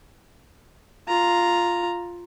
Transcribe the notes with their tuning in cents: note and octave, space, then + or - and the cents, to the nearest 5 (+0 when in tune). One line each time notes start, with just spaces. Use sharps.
F4 +0 A#5 +0